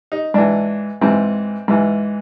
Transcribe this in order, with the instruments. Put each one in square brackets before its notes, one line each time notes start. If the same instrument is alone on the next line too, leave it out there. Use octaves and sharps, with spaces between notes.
[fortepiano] D#4
G#2 E3 D4
G#2 E3 C4
G#2 E3